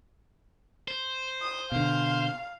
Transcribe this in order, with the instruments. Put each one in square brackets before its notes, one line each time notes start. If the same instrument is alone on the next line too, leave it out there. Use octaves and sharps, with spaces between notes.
[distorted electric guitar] C5
[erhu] D#6
[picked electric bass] B2 D3 [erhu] F5